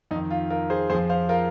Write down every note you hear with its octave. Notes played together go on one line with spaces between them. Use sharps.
F2 D#3 D#4
F4
F4 A#4
G#4 C5
F2 F3 G#4 C5
C5 F5
F4 A#4